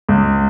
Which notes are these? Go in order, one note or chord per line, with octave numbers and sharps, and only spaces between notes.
C#2